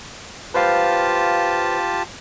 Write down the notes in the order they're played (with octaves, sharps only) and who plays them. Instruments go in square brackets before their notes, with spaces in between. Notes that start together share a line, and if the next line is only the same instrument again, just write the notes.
[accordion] F4 G4 A5 [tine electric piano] B4 C5 F5